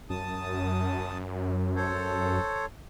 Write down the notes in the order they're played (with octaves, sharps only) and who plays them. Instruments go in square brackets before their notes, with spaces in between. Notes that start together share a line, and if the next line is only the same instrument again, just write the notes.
[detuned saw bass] F#2 [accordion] A5 D#6
[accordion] A4 C5 C#5